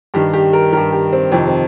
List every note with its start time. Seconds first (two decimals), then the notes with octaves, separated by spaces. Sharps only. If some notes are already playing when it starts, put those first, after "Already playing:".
0.14 G2 D#3 G4
0.34 G4
0.53 A#4
0.72 D#3 A#4
0.77 G2
0.93 G4
1.13 C4
1.32 F2 C3 D#3 C4
1.47 C4